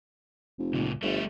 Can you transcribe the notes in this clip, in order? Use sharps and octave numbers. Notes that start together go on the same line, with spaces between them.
F1
C#2 A#2
G1 G3 A3